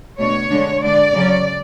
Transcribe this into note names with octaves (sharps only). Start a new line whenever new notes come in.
B2 A3 D4 C#5
D3 G#3 D4
D3 G#3 D4 D5
C#3 F#3 C#4